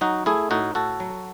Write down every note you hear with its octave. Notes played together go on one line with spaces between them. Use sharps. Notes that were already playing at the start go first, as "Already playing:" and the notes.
F#3 D#4 F#4
A3 E4 G#4
A2 D#4 F#4
A2 F#4 A4
F#3